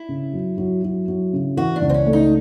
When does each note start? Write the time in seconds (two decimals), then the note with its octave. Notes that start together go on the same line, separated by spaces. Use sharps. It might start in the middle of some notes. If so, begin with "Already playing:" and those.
Already playing: E4
0.09 C#3
0.33 F#3
0.58 F#3
0.84 F#3
1.08 F#3
1.33 C#3
1.57 E3 F#4
1.76 D4
1.82 C#2
1.89 C4
1.94 C#4
2.06 A3
2.13 D#4